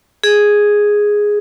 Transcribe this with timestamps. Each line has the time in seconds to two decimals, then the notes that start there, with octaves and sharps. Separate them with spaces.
0.24 G#4